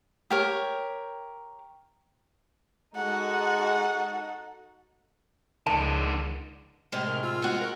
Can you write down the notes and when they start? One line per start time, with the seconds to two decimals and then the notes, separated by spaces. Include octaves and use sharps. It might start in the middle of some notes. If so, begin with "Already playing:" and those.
0.30 G4 A#4 C#5
2.96 G#3 D#4 F#4 A4 F#5
5.67 C#2 D#3 D4 A5
6.92 A2 C3 G#3 F6
7.07 D#3
7.23 F4 E6
7.42 G#3 C4 F#4 F#6
7.61 A#4 F#6